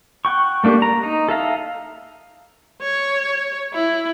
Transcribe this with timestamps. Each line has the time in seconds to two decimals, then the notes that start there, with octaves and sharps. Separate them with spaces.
0.25 F#5 G5 C#6
0.64 A3 A#3 D4 G4
0.82 A#5
1.03 D#4
1.29 A4 E5 F5 A#5
2.82 C#5
3.74 E4